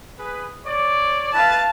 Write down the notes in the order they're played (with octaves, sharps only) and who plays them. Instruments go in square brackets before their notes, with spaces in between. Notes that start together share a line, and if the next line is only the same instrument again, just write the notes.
[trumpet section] G#4 B4
C#5 D5
[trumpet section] E4 B4 [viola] F5 A5